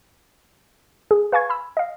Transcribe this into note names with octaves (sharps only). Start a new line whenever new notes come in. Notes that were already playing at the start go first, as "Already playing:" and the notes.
G#4
B4 F5 G#5 C#6 G#6
B5 E6
D#5 F5